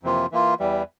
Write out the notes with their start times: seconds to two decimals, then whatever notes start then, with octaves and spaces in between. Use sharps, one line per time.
0.03 F2 C3 E3 A#3 F4
0.32 E3 A#3 F4
0.60 E2 E3 G3